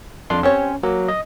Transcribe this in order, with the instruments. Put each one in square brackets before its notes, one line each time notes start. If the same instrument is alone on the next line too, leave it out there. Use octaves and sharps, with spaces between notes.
[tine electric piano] F2 D4 C6 [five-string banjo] F4
[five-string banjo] C4 G4 C#5 [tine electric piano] C#4
[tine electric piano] F#3 [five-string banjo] A#3
[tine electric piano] D#5